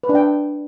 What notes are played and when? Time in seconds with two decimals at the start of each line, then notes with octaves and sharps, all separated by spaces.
0.03 B4
0.09 D4
0.15 G5